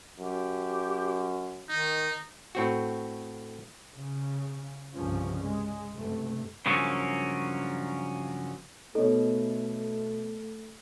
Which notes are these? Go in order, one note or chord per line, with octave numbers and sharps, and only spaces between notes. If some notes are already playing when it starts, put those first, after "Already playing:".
F#2 G4
D#3 D#4
A2 C4 F#4
C#3
C2 G2 C#3 F3 C#4
G#3
F#1 G2 C3 A3
G2 C#3 F3 F#3 A#3 C#4
B2 A3 D#4 A4 C#5